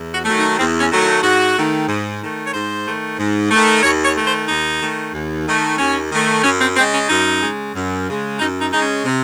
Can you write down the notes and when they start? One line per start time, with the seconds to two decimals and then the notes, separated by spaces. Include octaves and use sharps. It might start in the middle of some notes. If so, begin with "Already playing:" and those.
Already playing: E2
0.14 F#4
0.25 D#3 F#3 A3
0.36 D#4
0.58 E2 C4
0.80 C#4
0.90 D#3 F#3 A3
1.01 E4
1.22 G#2 F#4
1.55 D#3 A3
1.87 G#2
2.20 D#3 A3
2.46 C#5
2.54 G#2 C5
2.86 D#3 A3
3.19 G#2
3.51 D#3 A3
3.83 D#2 C#5
4.05 C#5
4.16 D#3 A3
4.27 C5
4.48 D#2 D#4
4.82 D#3 A3
5.13 D#2
5.46 D#3 A3
5.78 D#2 C#4
6.12 D#3 A3
6.44 F#2 C#4
6.61 C4
6.77 C#3 G#3 C4
6.93 C#4
7.09 F#2 D#4
7.41 C#3 G#3
7.75 F#2
8.08 C#3 G#3
8.39 F#2 D#4
8.61 D#4
8.72 C#3 G#3 D#4
8.82 C#4
9.05 C3